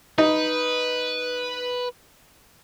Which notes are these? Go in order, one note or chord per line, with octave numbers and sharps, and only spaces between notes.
D#4 B4